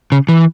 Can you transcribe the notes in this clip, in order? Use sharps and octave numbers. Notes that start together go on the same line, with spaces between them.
C#3
E3